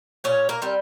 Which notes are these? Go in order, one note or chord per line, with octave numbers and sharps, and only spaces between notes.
A#2 C#4 C#5
A#3 A#4
G3 C4